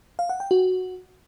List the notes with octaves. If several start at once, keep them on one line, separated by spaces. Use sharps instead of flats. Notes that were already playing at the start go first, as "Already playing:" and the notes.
F5
F#5
G5
F#4